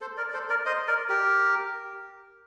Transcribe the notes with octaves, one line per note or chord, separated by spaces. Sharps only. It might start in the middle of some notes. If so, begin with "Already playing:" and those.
A4 C5
A#4 D5
D5
A4 C5
A#4 D5
C5 D#5
A#4 D5
G4 A#4